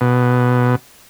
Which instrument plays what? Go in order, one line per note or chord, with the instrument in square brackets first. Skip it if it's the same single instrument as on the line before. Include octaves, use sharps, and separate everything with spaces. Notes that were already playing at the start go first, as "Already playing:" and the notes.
[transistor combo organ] B2